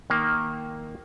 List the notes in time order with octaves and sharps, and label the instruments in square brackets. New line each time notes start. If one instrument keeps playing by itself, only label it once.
[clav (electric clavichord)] D#3 A#3